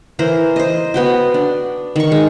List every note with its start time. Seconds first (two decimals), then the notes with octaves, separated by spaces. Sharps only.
0.19 E3 A#4 C5
0.56 C5 D#5
0.94 B3 F#4 G5
1.34 D4
1.96 D#3 C#6
2.12 G#3